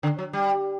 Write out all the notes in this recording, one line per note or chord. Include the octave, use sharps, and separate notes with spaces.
D3
F#3
G3